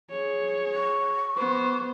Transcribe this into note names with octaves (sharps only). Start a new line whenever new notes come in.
G#4 C#5
C#6
B3 C5